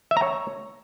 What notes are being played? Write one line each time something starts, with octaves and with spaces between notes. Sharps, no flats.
E5
A#5
C#5